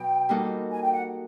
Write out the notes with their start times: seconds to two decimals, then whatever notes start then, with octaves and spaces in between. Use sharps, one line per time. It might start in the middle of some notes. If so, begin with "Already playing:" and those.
Already playing: B2 F#3 B3 G5
0.29 G3 A#3 D#4 F#4 A4
0.72 G#5
0.82 G5
0.93 F#5